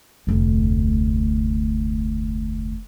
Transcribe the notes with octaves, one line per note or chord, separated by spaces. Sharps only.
F1 D2